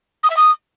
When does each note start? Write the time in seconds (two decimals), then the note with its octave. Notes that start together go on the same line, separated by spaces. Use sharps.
0.23 D#6
0.30 E5
0.36 D#6